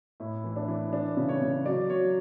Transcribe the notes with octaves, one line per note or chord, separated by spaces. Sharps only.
A2 E4
E3
D4
E3
E3 D4
C#3
C#5
C#3
F#3 D5
F#3 C#5